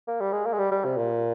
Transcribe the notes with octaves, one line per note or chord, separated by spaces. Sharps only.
A#3
G3
G#3
A#3
G#3
G3
G3
C3
A#2